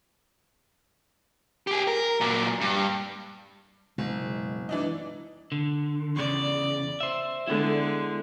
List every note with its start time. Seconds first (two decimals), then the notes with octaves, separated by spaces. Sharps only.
1.67 G4 G#4
1.88 A#4
2.21 A#2 F#3
2.61 G2
3.98 F#1 B2 G#3
4.69 E3 D4 D#4
5.52 D3
6.16 E2 C#3 D5
7.00 C5 E5
7.48 D3 G#3 B3 E4